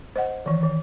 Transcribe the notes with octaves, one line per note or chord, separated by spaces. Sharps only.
C5 D#5 F#5
D#3 E3
D#3